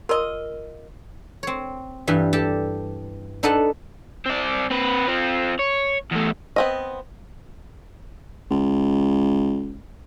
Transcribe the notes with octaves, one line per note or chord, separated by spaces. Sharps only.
F4 A#4 D#5
C4 C#5
G2 E3 G3
G4 A4 D5 A5
D4 D#4 A4 B4 F#5 A5
C4 D5
C4 B4
C4 F4
C#5
E2 A3
B3 C4 D#5
C#2